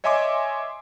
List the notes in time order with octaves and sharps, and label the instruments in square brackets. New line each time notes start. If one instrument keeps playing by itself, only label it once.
[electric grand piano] C#5 D#5 E5 G#5 C6 D6